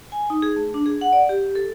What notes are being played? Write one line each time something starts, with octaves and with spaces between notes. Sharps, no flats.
G#5
D#4
G#4
A3
D4
G#4
F#5
D5
G4
A4